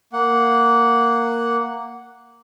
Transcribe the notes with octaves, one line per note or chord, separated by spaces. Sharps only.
A#3 F#5